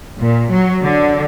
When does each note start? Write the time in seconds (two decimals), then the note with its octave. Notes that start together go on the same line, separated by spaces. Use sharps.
0.19 A#2
0.52 F#3
0.83 D3